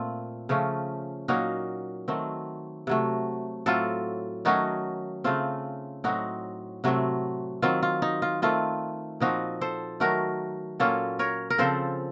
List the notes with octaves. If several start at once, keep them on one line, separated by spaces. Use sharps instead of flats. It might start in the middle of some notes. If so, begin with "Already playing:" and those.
Already playing: A#2 A3 C4 F4
C#3 F3 A3 C#4
A#2 F#3 A#3 C#4 D#4 F#4
D#3 F#3 A3 C4
C3 F#3 A3
A2 F#3 C4 F4 A4
D#3 F#3 A3 C#4 D#4 F#4
C#3 A3 C4 F4
A2 F#3 C4 D#4 F#4
C3 F#3 A3 C4
D#3 F#3 C4 F4
F4
D#4
F4
D#3 A3 C4 F4
A#2 F3 C4 D#4 F#4
A4 C5
D#3 F#3 A3 F#4 A#4
A#2 F#3 A#3 C#4 F4 A4
A#4 C#5
A#4
C#3 F3 C4 A4 C5